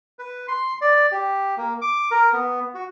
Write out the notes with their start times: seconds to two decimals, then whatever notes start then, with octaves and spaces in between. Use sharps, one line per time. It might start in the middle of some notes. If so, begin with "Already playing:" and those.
0.19 B4
0.48 C6
0.81 D5
1.12 G4
1.57 A#3
1.81 D6
2.11 A#4
2.33 B3
2.74 F#4